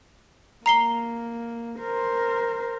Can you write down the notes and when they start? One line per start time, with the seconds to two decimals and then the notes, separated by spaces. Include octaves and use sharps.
0.66 A#3 A#5 C7 G7
1.79 A#4 C5